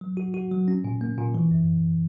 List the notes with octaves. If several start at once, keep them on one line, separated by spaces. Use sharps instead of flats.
F#3
F#4
F#4
F#3
C#4
A#2
A#3
A#2
E3
F#2